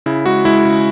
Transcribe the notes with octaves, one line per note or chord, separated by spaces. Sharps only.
C#3 E4
G#3 F#4
G#3 E4
C#3